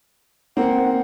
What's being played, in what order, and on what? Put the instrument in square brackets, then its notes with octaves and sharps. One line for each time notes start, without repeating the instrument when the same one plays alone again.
[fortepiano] A#3 C4 [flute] F#5